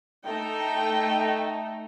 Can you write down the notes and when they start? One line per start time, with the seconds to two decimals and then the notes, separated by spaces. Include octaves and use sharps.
0.24 A3 D#4 G5